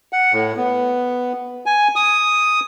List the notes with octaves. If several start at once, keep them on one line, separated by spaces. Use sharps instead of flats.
F#5
A2
B3
G#5
D#6